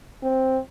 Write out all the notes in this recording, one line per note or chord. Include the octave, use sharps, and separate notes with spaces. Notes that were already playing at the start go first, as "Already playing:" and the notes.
C4